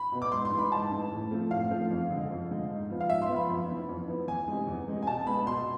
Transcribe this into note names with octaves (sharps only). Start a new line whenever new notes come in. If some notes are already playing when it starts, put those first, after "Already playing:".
Already playing: B5
B2 B3
D6
G#2 C6
C6
E3 G#3
B5
G#2 A5
E3 G#3
A2
F3 A3 C4
A2 F5
F3 A3 C4
F2
D3 G#3
F2
D3 G#3
G#2
F3 B3
F5
G#2 E5
C6
F3 B3
B5
F2
E3 B3
F2
E3 B3
E2 G#5
C3 G#3
E2
C3 G#3
G#5
B2 A5
G#3 B3 B5
B2 C6